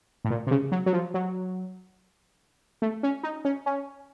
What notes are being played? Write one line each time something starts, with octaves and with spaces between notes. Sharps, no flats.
A2
A#2
C3
C#3
F#3
F#3
F3
F#3
A3
C#4
D#4
C#4
C#4